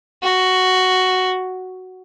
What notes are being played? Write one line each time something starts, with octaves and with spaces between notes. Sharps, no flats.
F#4